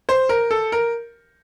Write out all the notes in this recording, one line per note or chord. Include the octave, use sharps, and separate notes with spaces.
C5
A#4
A4
A#4